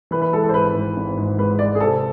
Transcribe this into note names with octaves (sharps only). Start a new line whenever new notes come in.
E3 B4
B4
G#3 A4
A4
C5
G#1 B4
G#2
G#1
G#2
G#3 B4
G#3 D5
G#4
C3 A4